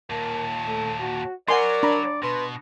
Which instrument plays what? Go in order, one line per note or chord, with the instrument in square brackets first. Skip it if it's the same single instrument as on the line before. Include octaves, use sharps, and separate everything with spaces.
[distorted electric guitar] D#2 A#2 [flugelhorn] A#4 [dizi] A5
[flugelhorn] A3
F#4
[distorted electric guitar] F#3 [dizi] A#4 [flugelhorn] D5 [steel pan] F#5 G#5 C6
[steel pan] D4 A#5 B5
[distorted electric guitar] B2 [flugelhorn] B4 [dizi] C6